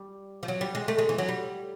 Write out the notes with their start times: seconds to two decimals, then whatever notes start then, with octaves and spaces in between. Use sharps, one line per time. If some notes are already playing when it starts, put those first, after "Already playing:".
Already playing: G3
0.43 F3
0.48 F#3
0.61 G3
0.75 G#3
0.88 A3
0.98 G#3
1.09 E3
1.18 F#3
1.28 G3